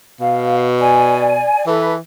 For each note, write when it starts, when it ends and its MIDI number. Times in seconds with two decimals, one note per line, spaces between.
0.20 1.49 47
0.20 0.67 77
0.80 1.66 74
0.80 1.66 80
1.67 1.97 52
1.67 1.95 69
1.67 1.95 71